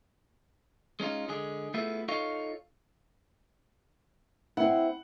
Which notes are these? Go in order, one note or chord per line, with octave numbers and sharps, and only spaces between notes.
G#3 C#4 D#4 F4
D3 G#3 G#4
A3 B3 E4 F4 G#4 A4
D#4 F4 A4 C#5 D#5 F5
C4 E4 F#5